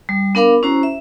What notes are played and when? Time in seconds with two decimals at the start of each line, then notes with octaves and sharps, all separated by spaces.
0.09 G3
0.35 B3 D4 A#4 F5 B5 D6
0.63 C#4 E4 F#4 C5 A#5
0.83 E5